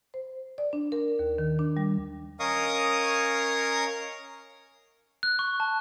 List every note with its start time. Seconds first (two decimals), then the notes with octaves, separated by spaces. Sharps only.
0.14 C5
0.58 D5
0.73 D4
0.92 A#4
1.19 D#2
1.38 D#3
1.59 D4
1.77 G3
2.40 C#4 A#4 D#5 F5 C#6 D#6
5.23 F#6
5.39 C#6
5.60 A5